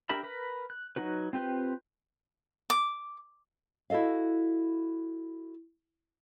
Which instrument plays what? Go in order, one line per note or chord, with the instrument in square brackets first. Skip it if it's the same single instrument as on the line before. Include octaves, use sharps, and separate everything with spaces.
[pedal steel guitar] D4 G4 A#4 E5 B5
A#4 B4 B5
F#6
F#3 D#4 F#4 B4
C4 F4 G4 B4 C5
[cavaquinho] D6
[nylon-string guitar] E4 F#4 A4 D#5 F5